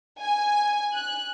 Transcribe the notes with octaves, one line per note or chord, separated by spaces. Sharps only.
G#5
F#6